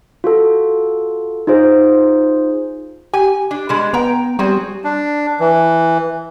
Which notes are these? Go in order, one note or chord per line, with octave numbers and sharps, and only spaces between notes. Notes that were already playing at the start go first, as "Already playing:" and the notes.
F4 F#4 A4
D#4 F4 G#4 C5
G4 G#5
D4
B2 G3 G#3
B3 G5 A#5
G3 C4 F#4 G#4
D4
E3